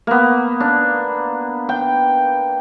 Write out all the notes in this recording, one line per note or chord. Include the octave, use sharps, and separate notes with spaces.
A#3 B3
D4
G5